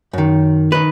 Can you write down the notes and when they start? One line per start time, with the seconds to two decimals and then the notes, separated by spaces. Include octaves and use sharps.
0.13 F#2 D#3
0.72 D#3 B4